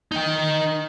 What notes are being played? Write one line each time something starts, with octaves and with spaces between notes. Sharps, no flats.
D#4 G5